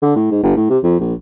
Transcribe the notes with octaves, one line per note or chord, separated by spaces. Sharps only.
D3
A2
G#2
G1
A2
C3
F2
A#1